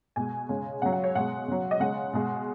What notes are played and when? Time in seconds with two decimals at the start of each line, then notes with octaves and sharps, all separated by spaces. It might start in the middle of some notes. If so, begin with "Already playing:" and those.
0.16 B2 G#3 G#5
0.49 C#3 G#3
0.82 C#3 F#3 F#5
0.92 F#5
1.04 C#5
1.15 B2 G#3 F#5
1.48 C#3 F#3
1.71 D#5
1.80 C#3 G#3 F#5
2.13 B2 G#3